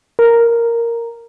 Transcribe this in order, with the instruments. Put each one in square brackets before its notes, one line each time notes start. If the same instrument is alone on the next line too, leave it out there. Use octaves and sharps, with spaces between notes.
[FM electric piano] A#4